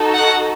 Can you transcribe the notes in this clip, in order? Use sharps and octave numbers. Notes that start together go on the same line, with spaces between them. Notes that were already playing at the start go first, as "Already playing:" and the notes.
Already playing: D#4 F#4 A4
F#5